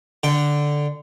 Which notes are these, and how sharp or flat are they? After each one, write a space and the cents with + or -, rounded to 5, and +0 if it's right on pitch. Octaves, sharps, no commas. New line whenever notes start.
D3 +0 G5 +0